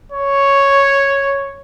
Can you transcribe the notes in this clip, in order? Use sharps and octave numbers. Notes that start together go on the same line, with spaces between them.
C#5